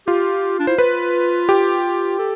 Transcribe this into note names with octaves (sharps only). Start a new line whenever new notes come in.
F4 G4
D4
E4 C5
F4 B4
G4
A4